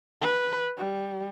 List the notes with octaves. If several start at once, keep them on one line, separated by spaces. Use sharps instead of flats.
B4
G3